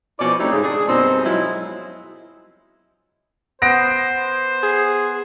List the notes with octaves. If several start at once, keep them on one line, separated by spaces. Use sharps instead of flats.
B2 F3 C#4 E4 D5
G3 A3 C4 C#4 D#4 E4
G#2 C#3
D4 G#4
F#2 B2 G3 C4 D#4 D#5
F3 F#3 G#3 D#4 E4
B3 C5 A#6 D7
G#4